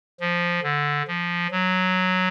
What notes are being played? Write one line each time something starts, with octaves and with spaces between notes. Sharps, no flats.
F3
D3
F3
F#3